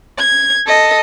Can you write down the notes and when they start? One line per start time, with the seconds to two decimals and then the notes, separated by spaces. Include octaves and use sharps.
0.18 G#6
0.66 A4 D#5